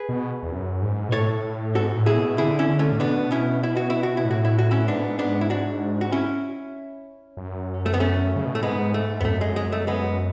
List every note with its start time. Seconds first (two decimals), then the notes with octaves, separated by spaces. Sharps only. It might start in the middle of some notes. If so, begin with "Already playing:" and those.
Already playing: G#4 B4
0.09 B2
0.43 E2
0.51 F#2
0.82 G#2
1.09 B2
1.12 A2 A4 C#5
1.75 G#2 F#4 A4
1.96 A2
2.06 E4 G#4
2.17 B2
2.38 D3 E4 G#4
2.59 C#4 E4
2.68 D3
2.79 A3 C#4
2.92 A2
3.00 B2 B3 D4
3.32 C#4 E4
3.63 E4
3.77 F#4
3.90 E4
4.03 F#4
4.17 E4
4.25 A2
4.31 F#4
4.45 E4
4.58 F#4
4.71 C#4 E4
4.87 G#2 B3 D4
5.19 B3 D4
5.41 E4
5.50 D4 F#4
6.01 F#4
6.12 C#4 E4
7.37 F#2
7.86 A3
7.94 B3
8.00 A3 C#4
8.36 C#3
8.45 B2
8.53 A2 A3
8.63 G#2 G#3 B3
8.94 A3
9.21 E2 B3
9.25 F#2 A3
9.41 G#3
9.56 G#3
9.72 A3
9.87 G#3 B3